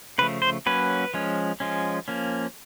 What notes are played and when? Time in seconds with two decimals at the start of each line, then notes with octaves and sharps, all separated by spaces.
0.18 C#3 F3 A3 B4
0.42 C5
0.66 F#3 A#3 C#4 B4
1.14 F3 G#3 C#4
1.60 F3 G#3 C#4
2.08 F3 A#3 C#4